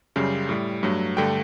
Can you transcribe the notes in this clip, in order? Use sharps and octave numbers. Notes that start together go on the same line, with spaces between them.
F#2 C#3 G3
A2 G3
G2 F#3 A3
G2 D3 A3 G5